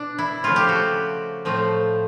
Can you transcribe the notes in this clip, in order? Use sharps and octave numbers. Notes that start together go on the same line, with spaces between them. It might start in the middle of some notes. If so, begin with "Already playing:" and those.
Already playing: B2 D4
E4
C#3 F3 A3 C4 F4
G4
F#4
A2 F3 A3 C4